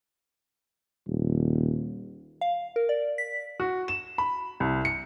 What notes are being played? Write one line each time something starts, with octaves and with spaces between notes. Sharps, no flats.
D#1
F5
A#4
D5
B6
F#4
E7
B5
C2
C#7